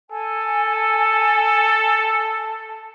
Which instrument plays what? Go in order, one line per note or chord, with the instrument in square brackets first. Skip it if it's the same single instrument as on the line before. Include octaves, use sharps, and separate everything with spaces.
[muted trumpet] A4 [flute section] G#5